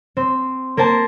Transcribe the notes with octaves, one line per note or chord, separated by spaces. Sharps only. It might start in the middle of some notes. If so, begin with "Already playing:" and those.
C4
A#3 A#4 C5 A5